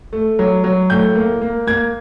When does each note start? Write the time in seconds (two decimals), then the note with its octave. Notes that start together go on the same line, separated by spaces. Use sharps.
0.13 A3
0.39 F#3
0.64 F#3
0.90 A2 G6
1.15 A#3
1.41 A#3
1.67 A#3 G#6